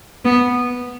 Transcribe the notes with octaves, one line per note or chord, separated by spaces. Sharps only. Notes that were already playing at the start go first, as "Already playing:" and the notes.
B3